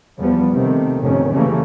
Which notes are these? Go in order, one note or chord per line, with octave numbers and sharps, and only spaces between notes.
E2 F3 G3 B3
C3 D#3 A3
G1 C2 F2 A2 D#3 C#4
C#3 E3 G3 A3 A#3 C#4